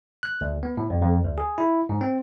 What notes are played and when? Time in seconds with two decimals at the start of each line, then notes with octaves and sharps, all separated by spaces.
0.23 F#6
0.41 D2
0.63 B3
0.77 A2
0.90 F2
1.02 F2
1.24 D2
1.38 G#4
1.58 E4
1.89 G#2
2.01 C4